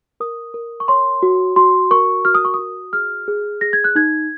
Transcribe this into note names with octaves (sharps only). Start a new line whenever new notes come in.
A#4 D#6
A#4
C#6
C#5 C6
F#4
F#4 C6
A#4 C#6
F#4 F6
D#6
C#6
F#4 D#6
G#4 F6
G#4
G#4 A#6
G#6
F#6
D#4 G#6